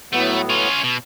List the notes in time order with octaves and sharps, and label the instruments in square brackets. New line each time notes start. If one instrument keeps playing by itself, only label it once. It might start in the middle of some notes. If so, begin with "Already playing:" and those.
[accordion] A2 F#3 B3 [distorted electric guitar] A3
[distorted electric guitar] C#4 F4
B2